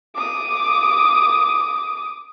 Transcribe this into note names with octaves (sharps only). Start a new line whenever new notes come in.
D6 D#6